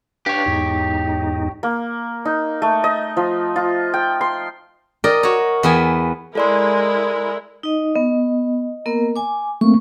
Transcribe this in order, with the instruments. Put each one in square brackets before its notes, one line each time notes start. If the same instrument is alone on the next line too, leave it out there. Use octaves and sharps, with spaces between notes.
[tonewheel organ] D4 B4 F5 [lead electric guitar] G4 C#5
[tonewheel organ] E2 G#2 D#4
[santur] A#3
D#4
A3
D#5
F3
F4
G5
C6
[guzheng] A#4 D5 D#5 G5
F#4 C#5
E2 B3 G5 G#5
[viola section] G#3 E4 A#4 [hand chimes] A4 D5 C6
[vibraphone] D#4 D#5
[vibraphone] B3 [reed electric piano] D#5
[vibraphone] A#3 B3 A#4
G#5 D6
[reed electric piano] A3 A#3 C4 [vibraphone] C#6